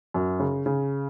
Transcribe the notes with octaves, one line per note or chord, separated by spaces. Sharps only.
F#2
C#3
C#3